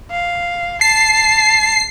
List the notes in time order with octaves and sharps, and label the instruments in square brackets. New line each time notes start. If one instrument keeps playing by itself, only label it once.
[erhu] F5
[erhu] A5 [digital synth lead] C7